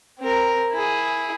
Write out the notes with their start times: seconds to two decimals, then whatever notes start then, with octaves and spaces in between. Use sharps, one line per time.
0.19 C4 A#4
0.72 E4 G#4